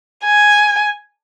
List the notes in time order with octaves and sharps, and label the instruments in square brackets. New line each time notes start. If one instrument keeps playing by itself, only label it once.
[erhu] G#5